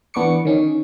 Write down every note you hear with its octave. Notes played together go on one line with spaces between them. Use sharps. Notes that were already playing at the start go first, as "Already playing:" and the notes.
E3 B3 D4 C#6 D6 C#7
D#3 C#4 D#4